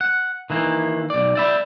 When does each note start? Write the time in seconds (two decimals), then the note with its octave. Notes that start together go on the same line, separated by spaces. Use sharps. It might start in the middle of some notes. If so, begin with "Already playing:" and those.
0.01 F#5
0.50 D#3 E3 A#3
1.10 B1 D5
1.35 D5 E5 B5